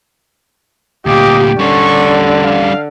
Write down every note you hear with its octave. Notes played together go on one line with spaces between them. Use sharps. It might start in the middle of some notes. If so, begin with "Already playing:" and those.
D2 A#2 G4 D#5 F5 D6
D3 G3 C#4 D5 C#6
F5